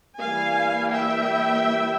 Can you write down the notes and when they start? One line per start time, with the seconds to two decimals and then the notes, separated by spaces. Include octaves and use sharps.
0.20 E3 G3 A#3 E4 F5 G#5
0.91 E5 G5